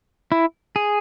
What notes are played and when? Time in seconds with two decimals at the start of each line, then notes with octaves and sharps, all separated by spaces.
0.32 E4
0.76 G#4